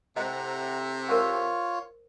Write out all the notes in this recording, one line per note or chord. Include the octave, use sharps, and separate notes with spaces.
A2 C3 C5 D#5 F#5 A#5
F4 A#4 C5 C#5 F#5